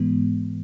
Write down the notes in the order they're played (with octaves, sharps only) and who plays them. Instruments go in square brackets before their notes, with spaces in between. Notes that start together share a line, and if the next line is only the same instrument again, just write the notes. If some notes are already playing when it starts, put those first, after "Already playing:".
Already playing: [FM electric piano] G#2 E3 G#3 B3